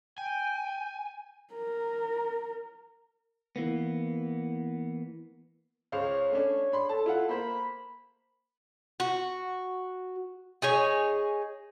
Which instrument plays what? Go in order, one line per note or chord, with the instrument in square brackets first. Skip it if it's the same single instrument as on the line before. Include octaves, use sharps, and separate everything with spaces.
[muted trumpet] G5 [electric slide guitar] G#5
[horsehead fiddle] A#4
[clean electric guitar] E3 A#3 B3
[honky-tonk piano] C#2 C5 F5 [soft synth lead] C#5
[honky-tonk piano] A3 C#4 D4
D4 B5 C6
[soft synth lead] A4 [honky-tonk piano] A5
[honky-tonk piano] E4 F4 F#5
[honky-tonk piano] A#3 C5 [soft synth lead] B5
[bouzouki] F#4
D#4 G#4 C#5